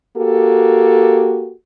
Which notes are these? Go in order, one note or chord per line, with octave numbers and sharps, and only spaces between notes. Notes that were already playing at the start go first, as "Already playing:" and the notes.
A#3 F#4 G4 A4